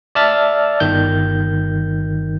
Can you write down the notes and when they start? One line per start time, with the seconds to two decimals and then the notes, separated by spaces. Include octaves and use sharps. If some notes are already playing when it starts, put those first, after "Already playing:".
0.15 D5 E5 A5 E6 F6 A6
0.80 G1 D#3 G6